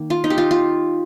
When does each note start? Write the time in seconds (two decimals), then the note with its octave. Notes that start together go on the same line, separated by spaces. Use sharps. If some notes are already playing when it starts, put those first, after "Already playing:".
Already playing: D#3 A#3
0.10 F4
0.24 D#4
0.30 G4
0.38 F4
0.51 F4